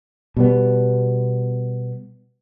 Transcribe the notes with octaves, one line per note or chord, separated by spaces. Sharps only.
B2 G3 B3